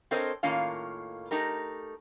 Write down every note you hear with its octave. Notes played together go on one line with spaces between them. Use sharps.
C4 A4 A#4 C5 C#5 D#5
A2 D#3 A#3 C#4 F4 F5
A3 D#4 G4 A#4